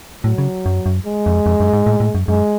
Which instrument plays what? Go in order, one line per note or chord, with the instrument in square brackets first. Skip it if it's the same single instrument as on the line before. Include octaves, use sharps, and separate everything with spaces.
[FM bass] A2 [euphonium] F#3
[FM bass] C#3
F#2
F#2
[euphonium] G#3
[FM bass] F2
F2
F#2
G#2
A2
A2
F#2
[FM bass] F#2 [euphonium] G#3